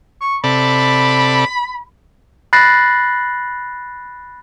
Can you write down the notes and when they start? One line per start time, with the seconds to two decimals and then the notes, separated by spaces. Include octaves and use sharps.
0.21 C#6
0.44 C3 A4 D5 B5
2.53 B5 F#6 A6 A#6 C7